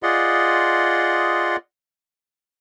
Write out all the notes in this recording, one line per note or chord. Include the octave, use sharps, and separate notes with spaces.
F4 G#4 D5 D#5 F#5 C6